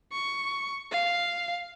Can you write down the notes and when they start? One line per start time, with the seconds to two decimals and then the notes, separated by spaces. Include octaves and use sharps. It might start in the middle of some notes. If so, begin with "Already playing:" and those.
0.13 C#6
0.91 F5